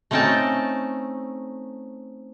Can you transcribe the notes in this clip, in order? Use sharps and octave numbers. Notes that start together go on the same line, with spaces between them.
A3 C4 C#4 D#4 G5 A5